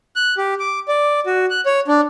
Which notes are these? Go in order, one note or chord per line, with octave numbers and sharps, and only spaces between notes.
F#6
G4
D6
D5
F#4
F#6
C#5
D4